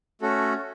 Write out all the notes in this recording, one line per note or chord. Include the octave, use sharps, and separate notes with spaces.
A3 C#4 F#4 A4